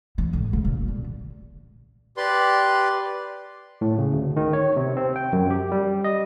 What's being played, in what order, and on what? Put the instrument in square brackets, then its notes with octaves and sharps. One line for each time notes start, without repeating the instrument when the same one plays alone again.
[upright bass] E3
A2
G#2
A#2
D3
[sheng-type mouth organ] G4 B4 D5 C6
[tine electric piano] A2
C#3
D2
D#3
C#5
C3
C4
G5
F#2
G4
G3
D#5